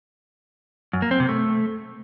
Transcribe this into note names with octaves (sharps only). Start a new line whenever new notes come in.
F#2
A#3
C4
C3
A3